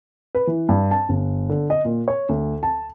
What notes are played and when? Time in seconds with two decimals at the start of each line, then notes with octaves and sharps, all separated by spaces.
0.35 B4
0.47 E3
0.69 G2
0.91 A5
1.09 G1
1.49 D3
1.70 D#5
1.85 A#2
2.08 C#5
2.29 D2
2.63 A5